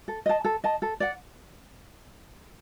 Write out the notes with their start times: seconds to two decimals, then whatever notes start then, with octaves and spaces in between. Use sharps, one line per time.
0.08 A4
0.26 D#5 A5
0.45 A4
0.64 D#5 A5
0.82 A4
1.00 D5 F#5